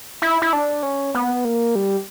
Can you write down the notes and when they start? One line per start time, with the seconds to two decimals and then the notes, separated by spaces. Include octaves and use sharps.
0.22 E4
0.42 E4
0.53 D4
0.83 C#4
1.14 B3
1.45 A#3
1.75 G3